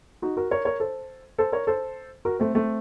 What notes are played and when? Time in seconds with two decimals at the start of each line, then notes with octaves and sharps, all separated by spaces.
0.22 D#4 F#4
0.37 F#4 A#4
0.51 A#4 C#5
0.65 A#4 C#5
0.80 A4 C5
1.38 A4 C5
1.52 A#4 C#5
1.67 A4 C5
2.25 F#4 A#4
2.40 A3 C4
2.54 A3 C4